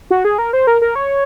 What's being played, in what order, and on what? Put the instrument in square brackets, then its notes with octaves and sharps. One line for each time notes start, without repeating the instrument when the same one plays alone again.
[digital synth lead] F#4
G#4
A#4
C5
A#4
A#4
C#5